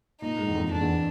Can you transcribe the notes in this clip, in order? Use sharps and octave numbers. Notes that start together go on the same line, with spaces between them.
A#2 D#4
G#2
E2
F2
F2 D4
E2